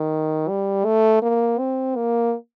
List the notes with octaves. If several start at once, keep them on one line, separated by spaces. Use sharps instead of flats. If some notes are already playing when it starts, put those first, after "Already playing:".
Already playing: D#3
G3
A3
A#3
C4
A#3